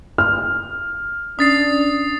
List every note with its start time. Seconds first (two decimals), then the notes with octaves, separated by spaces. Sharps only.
0.18 F6
1.39 C#4 D4 D#6 A6 C7